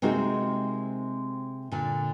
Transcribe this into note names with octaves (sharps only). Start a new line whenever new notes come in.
C3 G#3 A#3 C4 D#4 F#4
A#2 D3